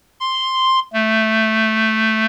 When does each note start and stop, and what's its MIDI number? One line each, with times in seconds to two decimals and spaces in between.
0.20 0.80 84
0.93 2.26 57